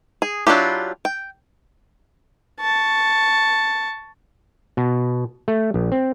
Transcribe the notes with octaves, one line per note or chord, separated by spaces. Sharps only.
G#4
F#3 D4 E4 F4 G4
G5
A5 C#6
B2
A3
A#1
C4